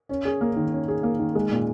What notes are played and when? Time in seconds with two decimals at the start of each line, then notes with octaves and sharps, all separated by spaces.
0.09 C#4
0.25 G#4
0.41 A#3
0.56 D#3
0.72 C#4
0.88 G#4
1.03 A#3
1.19 D#3
1.35 G#3
1.51 A#2